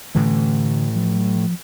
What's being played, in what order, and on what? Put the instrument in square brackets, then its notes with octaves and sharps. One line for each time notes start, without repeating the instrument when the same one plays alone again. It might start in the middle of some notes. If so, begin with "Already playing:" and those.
[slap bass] A2 E3 A3 [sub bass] D3
[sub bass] F3
F#3
F3